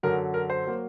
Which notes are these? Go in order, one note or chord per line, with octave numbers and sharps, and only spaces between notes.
F#2 D3 F#3 A#4
A#4
C5
F#3 A#3